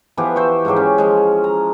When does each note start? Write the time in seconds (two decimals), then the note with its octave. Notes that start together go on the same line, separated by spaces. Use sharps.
0.17 E3 F3 B3 G4
0.36 C5 E5 C#6
0.65 G#2 F3 F#3 G4
0.76 C#4
0.98 F3 G#3
1.44 A#5